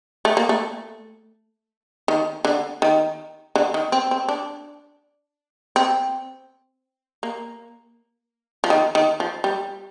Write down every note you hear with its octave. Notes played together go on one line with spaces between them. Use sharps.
A3
A#3
A3
D#3
D3
D#3
D3
D#3
C4
C4
D4
C4
A#3
F3
D#3
D#3
F3
G3